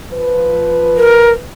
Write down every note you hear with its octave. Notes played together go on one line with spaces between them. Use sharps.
F3 B4
A#4